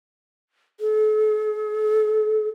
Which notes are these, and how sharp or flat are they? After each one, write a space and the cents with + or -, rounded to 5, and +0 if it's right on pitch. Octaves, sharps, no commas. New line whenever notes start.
A4 -40